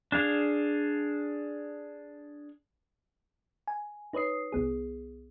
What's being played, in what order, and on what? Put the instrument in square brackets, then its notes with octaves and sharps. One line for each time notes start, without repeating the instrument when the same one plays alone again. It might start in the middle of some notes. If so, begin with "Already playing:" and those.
[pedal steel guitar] D4 G#4 F5
[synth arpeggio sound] G#5
D#4 B4 C#5 D#6 C7
C2 B3 G#4